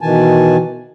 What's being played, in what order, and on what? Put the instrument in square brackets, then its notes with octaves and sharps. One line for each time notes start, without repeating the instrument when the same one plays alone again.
[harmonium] B2 D#3 E3 G#5 A5